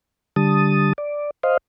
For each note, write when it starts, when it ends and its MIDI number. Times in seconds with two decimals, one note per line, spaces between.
0.36 0.93 50
0.36 0.93 55
0.36 0.93 81
0.36 0.93 87
0.98 1.31 74
1.43 1.57 72
1.43 1.57 75
1.43 1.57 77